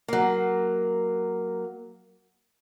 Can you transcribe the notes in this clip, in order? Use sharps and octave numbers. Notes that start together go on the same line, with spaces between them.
F#3 A#3